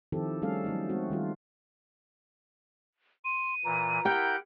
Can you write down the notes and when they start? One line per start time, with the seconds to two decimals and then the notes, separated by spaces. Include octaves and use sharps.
0.12 D#3 F3 C4 E4 G4 A4
0.42 G3 A3 C#4 G#4 A4 F5
0.64 F#3 A3 D#4
0.89 G#3 A3 C4 F#4
1.10 D#3 G3 F4
3.25 C6 D#7
3.65 A#2 E3 A#5
4.05 E4 G4 A#4 F#5 G5 G6